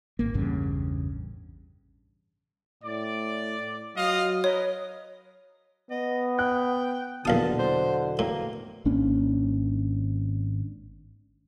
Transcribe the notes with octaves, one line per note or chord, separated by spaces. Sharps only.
G#1 A#3
A1 E2 G2 C#3
A2 D5
F#3 F4 D#5 F5
A#4 B4 C#5 D#5
B3 D#5
G5 F#6
A#1 E2 B2 D3 F#3 F5 A5 D#6
C5
A2 A#3
G#1 A#3 C#4 D4